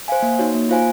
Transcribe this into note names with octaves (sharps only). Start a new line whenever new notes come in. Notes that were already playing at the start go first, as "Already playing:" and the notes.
C5 F5 G#5
A#3
D#4 F#4 C#5
A#3
F4 C5 F5 G#5